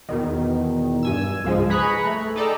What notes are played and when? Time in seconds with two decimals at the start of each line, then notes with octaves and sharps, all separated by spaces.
0.09 E2 B2 D#3
1.03 G2 G#5 E6
1.44 C#2 G#2 F3 G#3
1.70 G#4 B4 A#5 B5 C#6 F#6
2.05 A3
2.36 D#4 G#4 A4 D5 G5 A#5